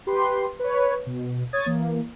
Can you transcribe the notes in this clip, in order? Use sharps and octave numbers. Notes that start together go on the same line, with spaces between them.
G4 B4 C6
B4 C#5
B2
C#5 D#6 G#6 A6
E3 A#3